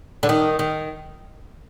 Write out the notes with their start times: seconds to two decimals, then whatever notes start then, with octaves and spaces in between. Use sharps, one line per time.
0.23 D3
0.29 D#3
0.59 D#3